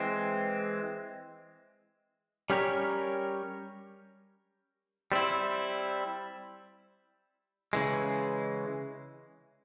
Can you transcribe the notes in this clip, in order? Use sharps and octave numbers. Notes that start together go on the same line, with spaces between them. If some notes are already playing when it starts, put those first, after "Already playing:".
Already playing: E3 G#3 C4
G3 C#4 G4 A#4 C#5
G3 C4 E4
C#3 E3 G#3